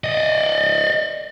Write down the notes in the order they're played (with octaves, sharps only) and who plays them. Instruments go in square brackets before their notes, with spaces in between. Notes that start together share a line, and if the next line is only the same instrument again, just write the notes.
[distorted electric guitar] D5 D#5